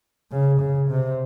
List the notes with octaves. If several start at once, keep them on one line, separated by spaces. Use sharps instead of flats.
C#3
C#3
C3